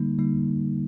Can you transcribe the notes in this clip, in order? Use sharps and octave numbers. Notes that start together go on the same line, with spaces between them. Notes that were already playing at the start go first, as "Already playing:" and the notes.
Already playing: D3 G3 A#3 D#4
D3 G3 A#3 D#4